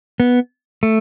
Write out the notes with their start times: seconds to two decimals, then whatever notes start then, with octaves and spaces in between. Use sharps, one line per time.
0.20 B3
0.83 A3